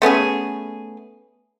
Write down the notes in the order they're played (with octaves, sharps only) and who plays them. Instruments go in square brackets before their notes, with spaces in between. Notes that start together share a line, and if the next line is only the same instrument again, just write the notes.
[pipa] A3 B3 C#4 G#4